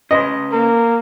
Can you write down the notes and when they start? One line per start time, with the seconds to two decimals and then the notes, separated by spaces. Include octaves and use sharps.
0.11 C#3 B4 D#5 C6
0.52 A#3 A#4